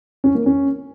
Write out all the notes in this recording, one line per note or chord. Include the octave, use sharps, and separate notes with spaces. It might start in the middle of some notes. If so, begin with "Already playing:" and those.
C#4
A#3
C#4